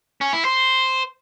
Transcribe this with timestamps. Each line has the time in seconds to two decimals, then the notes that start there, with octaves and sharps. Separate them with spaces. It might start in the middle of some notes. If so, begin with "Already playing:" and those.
0.21 C#4
0.33 E4
0.45 C5